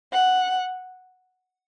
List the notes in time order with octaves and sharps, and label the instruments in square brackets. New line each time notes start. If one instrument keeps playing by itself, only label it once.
[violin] F#5